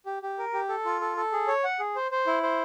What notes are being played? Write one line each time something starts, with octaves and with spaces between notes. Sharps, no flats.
G4
G4
A#4
G4
A4
F4
A4
A4
G#4
C#5
F#5
G#4
C5
C5
E4
C5